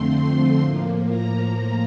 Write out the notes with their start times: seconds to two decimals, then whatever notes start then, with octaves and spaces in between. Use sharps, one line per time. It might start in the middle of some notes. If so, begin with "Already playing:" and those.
Already playing: F2 D3 F3 A3 C4 C6
0.59 A2 F3 A#3
1.09 A#5